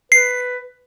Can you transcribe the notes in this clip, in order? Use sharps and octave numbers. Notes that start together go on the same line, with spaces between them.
B4 C7